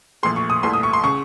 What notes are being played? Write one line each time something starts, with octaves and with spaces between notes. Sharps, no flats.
A#1 A#2 A3 C6
C#6
D#6
C2 A#2 A3 C6
D#6
C#6
C6
C#3 C#6